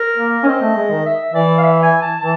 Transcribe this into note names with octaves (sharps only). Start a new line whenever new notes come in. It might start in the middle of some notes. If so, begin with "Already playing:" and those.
Already playing: A#4
A#3
C#4
C4 D#5
A3
G#3
D#3
E5
E3 D5
F5
E5
G#5
A5
E3 A5